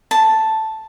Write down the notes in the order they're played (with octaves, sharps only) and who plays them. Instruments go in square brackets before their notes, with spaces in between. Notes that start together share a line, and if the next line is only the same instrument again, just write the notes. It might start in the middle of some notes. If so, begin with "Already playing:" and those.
[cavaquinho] A5